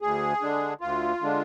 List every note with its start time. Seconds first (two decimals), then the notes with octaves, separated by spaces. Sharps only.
0.01 D2 G#4
0.42 D3 G#3 D4
0.81 D2 F4
1.21 D3 G#3 D4